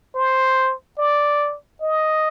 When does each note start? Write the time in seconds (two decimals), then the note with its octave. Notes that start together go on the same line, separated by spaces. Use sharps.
0.16 C5
0.99 D5
1.82 D#5